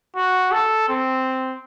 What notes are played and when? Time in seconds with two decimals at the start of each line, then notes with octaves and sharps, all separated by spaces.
0.16 F#4
0.52 A4
0.88 C4